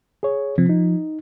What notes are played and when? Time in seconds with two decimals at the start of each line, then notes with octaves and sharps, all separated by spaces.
0.23 G#4 C#5
0.58 C3 F3 C4
0.69 D#4